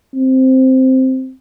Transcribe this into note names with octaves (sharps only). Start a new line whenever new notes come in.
C4